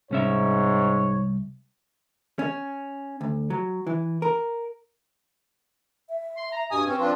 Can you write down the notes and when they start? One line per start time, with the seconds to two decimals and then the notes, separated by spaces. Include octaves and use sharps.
0.11 C2 G#2 C#4 C#5 E5
2.39 C#4
3.21 D2
3.50 F#3
3.87 E3
4.22 A#4
6.09 E5
6.37 C6
6.52 A#5
6.71 G2 B2 G4 G#5 D#6
6.87 C4 C#4 B4
6.99 F3 D4 F4 B4